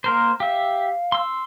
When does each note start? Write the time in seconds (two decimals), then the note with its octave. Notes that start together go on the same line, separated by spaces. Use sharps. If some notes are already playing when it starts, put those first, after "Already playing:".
0.04 A#3 A#4 C5 C6
0.40 G4 E5 F5
1.12 C6 E6